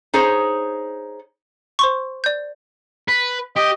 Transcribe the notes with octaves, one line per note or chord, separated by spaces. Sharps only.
D#4 G#4 C5 C#5
C5 C6 C#6
D5 G6
B4
G4 D#5